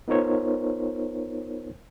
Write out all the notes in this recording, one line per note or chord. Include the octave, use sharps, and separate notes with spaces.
B3 D#4 F4 A#4 C5 C#5